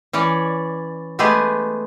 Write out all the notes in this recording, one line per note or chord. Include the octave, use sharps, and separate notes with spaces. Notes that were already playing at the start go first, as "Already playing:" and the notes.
E3 C#4 C#5 D5
G#3 A3 B3 G4 G#4 B4